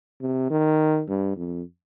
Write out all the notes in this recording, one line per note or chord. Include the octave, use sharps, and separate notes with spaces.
C3
D#3
G2
F2